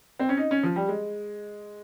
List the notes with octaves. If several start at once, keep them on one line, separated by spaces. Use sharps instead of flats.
C4
C#4
D#4
C#4
F3
G3
G#3